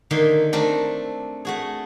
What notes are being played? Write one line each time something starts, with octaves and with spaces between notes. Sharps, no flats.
D3 D#3 A#3 E5 C6
A3 C4 D4 A4 A#4
A3 F#4 G#4